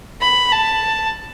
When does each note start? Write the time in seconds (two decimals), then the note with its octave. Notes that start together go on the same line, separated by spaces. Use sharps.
0.21 B5
0.52 A5